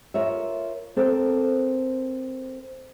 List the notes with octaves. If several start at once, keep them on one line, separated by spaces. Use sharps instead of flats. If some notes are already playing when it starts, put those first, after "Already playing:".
F4 A#4 C#5 E5
C4 A4 A#4